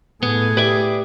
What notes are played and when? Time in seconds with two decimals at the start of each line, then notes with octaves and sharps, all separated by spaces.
0.23 A2 B3 G#4
0.57 G4 B4 D5 E5